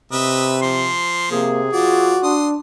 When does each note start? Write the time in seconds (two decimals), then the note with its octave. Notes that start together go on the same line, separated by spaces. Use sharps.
0.12 C3 B4 D#5 E5
0.62 F3 C6
1.31 C3 A#3 G#4
1.73 F3 F4 F#4 D5
2.23 D4 C6 D#6